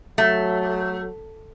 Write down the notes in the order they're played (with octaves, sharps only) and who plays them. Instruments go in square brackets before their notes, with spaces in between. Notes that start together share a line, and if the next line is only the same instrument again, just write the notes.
[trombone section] F#3 [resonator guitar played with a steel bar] A3